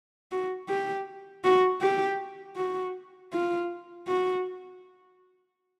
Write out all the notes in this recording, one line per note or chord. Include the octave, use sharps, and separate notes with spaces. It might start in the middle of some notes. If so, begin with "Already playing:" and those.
F#4
G4
F#4
G4
F#4
F4
F#4